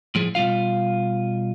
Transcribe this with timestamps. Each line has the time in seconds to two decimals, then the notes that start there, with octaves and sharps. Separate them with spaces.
0.15 A2 F3 G#4
0.35 B2 G3 F4 F5